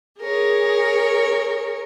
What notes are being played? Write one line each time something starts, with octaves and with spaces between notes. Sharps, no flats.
G#4 A#4 C#5